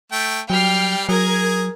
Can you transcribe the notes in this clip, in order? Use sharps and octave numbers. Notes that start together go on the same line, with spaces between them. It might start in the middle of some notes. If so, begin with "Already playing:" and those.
A3 G5
F#3 G3 G5 F6 C7
F#3 G#4 A#4 G#6